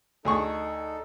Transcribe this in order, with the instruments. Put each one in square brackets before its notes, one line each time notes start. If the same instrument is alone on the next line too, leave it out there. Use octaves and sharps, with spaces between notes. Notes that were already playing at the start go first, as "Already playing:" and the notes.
[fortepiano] D2 G#4 C#6 [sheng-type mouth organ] D#4 A4